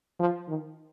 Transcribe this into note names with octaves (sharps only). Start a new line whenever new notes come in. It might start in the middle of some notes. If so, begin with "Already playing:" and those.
F3
D#3